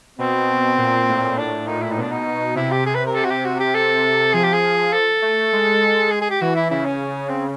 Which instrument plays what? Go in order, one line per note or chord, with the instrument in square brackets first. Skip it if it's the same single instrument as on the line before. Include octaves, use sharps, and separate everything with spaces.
[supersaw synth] B2 [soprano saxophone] C4
[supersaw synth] A#2
A2
[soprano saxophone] D4
[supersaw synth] A#2 [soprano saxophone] D#4
[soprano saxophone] E4
D#4
[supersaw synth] B2 [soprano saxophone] D4
[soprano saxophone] D#4
[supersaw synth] C3 [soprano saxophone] E4
[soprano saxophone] G4
G#4
B4
A#4
[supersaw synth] C3 [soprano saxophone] A4
[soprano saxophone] F#4
G4
F#4
G4
[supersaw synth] C3 [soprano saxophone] A4
[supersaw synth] F3 [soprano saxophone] G#4
[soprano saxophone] G4
G#4
A4
[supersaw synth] A3
G#3
[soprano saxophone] G#4
G#4
G4
[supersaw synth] E3 [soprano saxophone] F#4
[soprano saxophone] E4
[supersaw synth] C#3 [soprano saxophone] E4
[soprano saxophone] C#4
C4